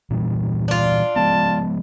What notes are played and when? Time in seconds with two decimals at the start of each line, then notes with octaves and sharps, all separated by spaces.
0.10 A#2 E3 G3
0.68 D4 F4
1.16 F3 G#3 B3 A5